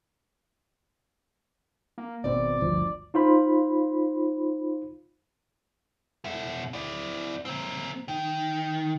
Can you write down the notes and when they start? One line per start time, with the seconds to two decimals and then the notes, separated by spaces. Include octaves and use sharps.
1.98 A#3
2.24 G#1 B2 C4 D5
2.60 G1 D2 F3
3.14 D#4 F4 C5 B5
6.25 B2 E5
6.73 E4 D5
7.45 A#3 C4
8.08 D#3